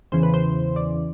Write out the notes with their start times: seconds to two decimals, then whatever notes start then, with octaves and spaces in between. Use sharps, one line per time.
0.12 E2 C#3 E3 C5
0.23 B4
0.34 C5
0.76 D5